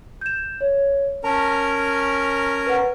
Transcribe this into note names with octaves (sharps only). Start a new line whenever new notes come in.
G6 E7
C#5
C#4 A#4 A5 A#5
B4 F#5